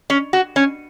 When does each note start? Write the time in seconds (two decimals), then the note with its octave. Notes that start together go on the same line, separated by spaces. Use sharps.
0.10 C#4
0.33 F#4
0.56 C#4